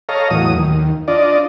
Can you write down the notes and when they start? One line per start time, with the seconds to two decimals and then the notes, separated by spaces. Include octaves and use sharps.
0.09 A4 C#5 D#5 F5 A#5
0.30 E2 A2 F#3 D#6
0.56 D#2
1.08 D4 F4 D5 D#5